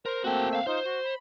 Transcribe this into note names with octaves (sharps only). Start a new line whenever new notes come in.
A#4 C5
A3 A#3 C4 F#4 G5
E5 F5
D#4 F4 C5
F#4
B5